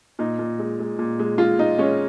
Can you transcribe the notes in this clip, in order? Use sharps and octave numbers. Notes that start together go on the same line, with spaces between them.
A#2 D#4
A#2
G#3
G#3
A#2
G#3
G#3 F4
G#3 D#4
G#3 C#4